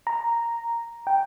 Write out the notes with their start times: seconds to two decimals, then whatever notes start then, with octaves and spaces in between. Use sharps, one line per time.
0.07 A#5
1.07 G5